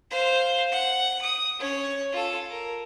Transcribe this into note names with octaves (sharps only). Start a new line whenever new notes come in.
C5 F5
F#5
D#6
C#4 C#5
F4 A4
A#4